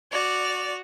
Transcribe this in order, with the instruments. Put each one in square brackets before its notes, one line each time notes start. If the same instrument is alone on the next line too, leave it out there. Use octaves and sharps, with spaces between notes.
[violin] F#4 F7 [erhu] D5